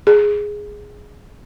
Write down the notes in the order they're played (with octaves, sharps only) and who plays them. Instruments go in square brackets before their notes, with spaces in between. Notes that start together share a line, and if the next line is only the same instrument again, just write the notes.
[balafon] G#4